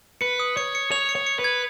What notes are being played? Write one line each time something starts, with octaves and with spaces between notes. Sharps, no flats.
B4 C#7
D#6
C#5 C#7
C#7
C#5 F7
C#7
C#5
C#7
B4
G#6